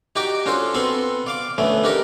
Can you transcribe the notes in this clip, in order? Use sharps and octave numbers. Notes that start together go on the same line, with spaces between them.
D#4 F#4 G4 D5 G5 D6
C#4 D4 F4 F#4 A4 C5
B3 C4 F#4 A4 C6
D5 F5 D6
D2 A3 B3 C#4
D4 D#4 G4 A4 A#4 D5